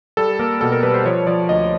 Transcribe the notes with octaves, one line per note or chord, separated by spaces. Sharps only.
G3 A4
A#3 A#4
B2 A4
A#4
G3 B4
C5
F3 C#5
F3 D5
D2 D#5